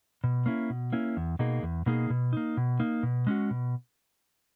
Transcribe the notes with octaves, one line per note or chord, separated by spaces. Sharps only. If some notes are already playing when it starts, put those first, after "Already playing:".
B2
A#3 C#4 E4
B2
A#3 C#4 E4
E2
B2 A#3 D#4 G#4
E2
B2 A#3 D#4 G#4
B2
A#3 D#4
B2
A#3 D#4
B2
G#3 C#4 F#4
B2